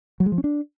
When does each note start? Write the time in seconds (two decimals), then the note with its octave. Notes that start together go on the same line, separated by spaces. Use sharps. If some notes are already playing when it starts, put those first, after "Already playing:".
0.20 F#3
0.26 G#3
0.32 F3
0.38 C#4
0.44 D4